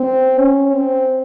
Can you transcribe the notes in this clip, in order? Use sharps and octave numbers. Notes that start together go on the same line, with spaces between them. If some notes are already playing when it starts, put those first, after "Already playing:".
Already playing: C4
C#4
C4